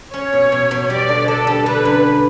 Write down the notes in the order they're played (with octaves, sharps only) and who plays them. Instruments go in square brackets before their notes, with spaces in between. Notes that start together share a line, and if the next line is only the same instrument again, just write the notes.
[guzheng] C#4 [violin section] C#5
[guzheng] B2
B2
B2
[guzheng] G3 [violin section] D5
[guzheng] D3
[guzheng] D3 [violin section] A4
[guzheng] G3
[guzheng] D3 [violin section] B4
[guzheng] F#2